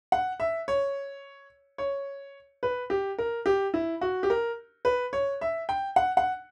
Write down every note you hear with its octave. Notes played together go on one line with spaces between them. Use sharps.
F#5
E5
C#5
C#5
B4
G4
A#4
G4
E4
F#4
G4
A#4
B4
C#5
E5
G5
F#5
F#5